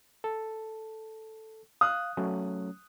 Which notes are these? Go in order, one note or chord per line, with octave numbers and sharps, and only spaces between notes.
A4
F5 D#6 F#6
F#3 A3 C#4